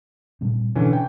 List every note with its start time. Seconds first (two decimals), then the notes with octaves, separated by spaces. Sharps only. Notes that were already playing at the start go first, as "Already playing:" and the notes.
0.41 A#2 G3 C4
0.75 B2 D3 E3 C#4
0.93 G5